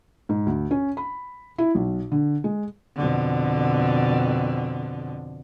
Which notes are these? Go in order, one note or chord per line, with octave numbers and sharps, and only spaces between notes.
G#2
D2
C#4
B5
E4
B1
D3
G#3
F2 B2 D3